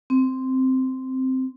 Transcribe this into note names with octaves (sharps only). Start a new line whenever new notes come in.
C4